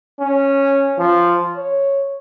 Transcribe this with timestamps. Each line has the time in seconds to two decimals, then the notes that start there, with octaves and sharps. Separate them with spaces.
0.20 C#4
0.98 F3
1.57 C#5